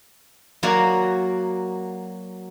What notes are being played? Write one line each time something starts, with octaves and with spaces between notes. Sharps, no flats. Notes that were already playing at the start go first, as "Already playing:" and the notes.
F#3 A#3 F#4 A#4 D5